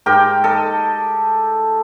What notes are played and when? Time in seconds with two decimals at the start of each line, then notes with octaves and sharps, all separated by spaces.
0.06 G#2 G4 A#4 G5
0.44 A4 D#5